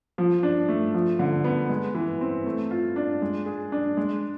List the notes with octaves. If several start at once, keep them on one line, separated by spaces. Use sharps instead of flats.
F3
D4
A3
F3
D3
B3
G#3
E3
C4
A3
F4
D4
G#3
G#4
D4
G#3